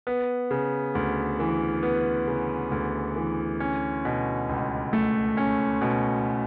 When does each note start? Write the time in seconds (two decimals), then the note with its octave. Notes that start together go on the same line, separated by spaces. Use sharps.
0.07 B3
0.51 C#3
0.95 D2
1.40 E3
1.83 B3
2.27 C#3
2.71 D2
3.16 E3
3.60 C#4
4.05 B2
4.49 C#2
4.93 A3
5.37 C#4
5.81 B2